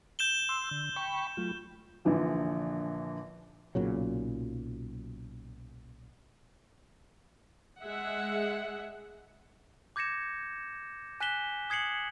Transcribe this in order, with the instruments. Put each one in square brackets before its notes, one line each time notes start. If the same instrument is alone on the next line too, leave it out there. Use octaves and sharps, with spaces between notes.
[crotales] G6 E7 G7
[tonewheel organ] C6 E6
D3
G5 B5 C#6
F#3 A3 F4
[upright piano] A#1 A#2 D3 E3 F3
[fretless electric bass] B1 A#2 C#3 F#3
[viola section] G#3 G#4 E5 F#5
[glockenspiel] D6 G6 G#6 A#6 C#7 E7
G#5 F#6 B6 E7 G7
D#6 G#6 C7 C#7 F#7